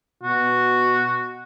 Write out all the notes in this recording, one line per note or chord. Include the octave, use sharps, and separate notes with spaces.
B2 F#4